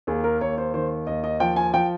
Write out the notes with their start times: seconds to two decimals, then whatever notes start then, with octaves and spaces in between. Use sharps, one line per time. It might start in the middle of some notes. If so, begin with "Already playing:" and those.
0.07 D#2 G#4
0.24 A#4
0.41 D#2 C#5
0.58 C5
0.74 D#3 C5
1.07 D#2 D#5
1.24 D#5
1.40 F3 G5
1.56 G#5
1.74 F3 G5